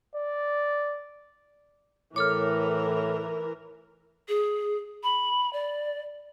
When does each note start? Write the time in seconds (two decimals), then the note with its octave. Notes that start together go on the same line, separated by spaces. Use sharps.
0.16 D5
2.16 A2 E3 A4 A#4 C#5 D6 F6
4.28 G#4
5.03 B5
5.53 D5